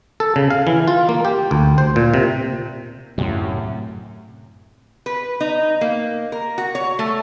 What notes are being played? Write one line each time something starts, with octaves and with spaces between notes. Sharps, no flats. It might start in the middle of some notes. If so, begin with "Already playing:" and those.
A4
C#3
F5
E3
F4
A#3
G4
D2
C5
A#2
C3
F#2 A2 C3 F#3
B4
D#4
A#3
A#4
F#4
C#5
A3